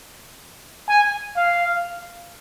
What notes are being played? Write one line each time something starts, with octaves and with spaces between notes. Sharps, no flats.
G#5
F5